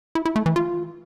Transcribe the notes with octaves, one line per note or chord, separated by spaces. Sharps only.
E4
E4
A3
E3
F4